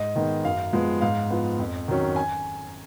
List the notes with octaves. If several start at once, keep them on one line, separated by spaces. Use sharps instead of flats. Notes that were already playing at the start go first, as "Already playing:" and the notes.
Already playing: G#2 D#5
D#3 G#3 B3 D#4
F#2 F5
F3 G#3 B3
G#2 F5
F3 B3
F2
D#3 F#3 C#4
G#5